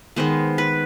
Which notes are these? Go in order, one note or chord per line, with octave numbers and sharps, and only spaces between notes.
D#3 G#3 B3 C5
B4